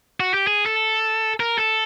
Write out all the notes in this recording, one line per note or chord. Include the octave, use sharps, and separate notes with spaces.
F#4
G4
G#4
A4
A#4
A4